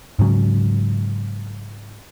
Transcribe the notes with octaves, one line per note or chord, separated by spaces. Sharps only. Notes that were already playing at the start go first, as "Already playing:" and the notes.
G#2 C#3 F#3